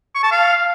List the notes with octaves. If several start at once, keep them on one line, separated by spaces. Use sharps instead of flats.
C#6
A5
F5